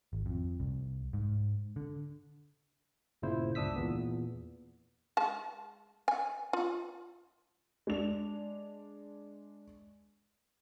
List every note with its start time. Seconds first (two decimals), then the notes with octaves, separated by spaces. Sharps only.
0.13 G#1
0.26 F2
0.60 C2
1.13 G#2
1.76 D3
3.22 G1 A#2 C#3 E4 C5
3.55 G1 C#2 D4 D#6 E6 B6
3.76 E2 A#2 B3
5.17 G#3 A5
6.08 G#5
6.53 F4
7.87 G#3 D4 F7